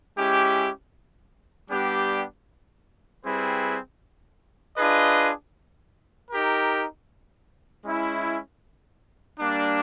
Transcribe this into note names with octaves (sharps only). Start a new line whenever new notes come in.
G#3 C#4 E4 G4
G3 B3 D4 G4
G3 C4 E4 G#4 B4
D4 F4 G#4 B4 D#5
D#4 G4 A#4
G#3 C#4 E4
G3 A#3 D4